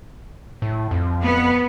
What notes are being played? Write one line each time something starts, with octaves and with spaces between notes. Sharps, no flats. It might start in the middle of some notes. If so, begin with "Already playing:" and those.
A2
F2
B3